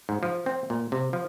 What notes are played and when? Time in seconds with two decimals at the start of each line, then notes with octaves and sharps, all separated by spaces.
0.09 G#2
0.23 F3
0.46 C4
0.70 A#2
0.92 C3
1.13 F3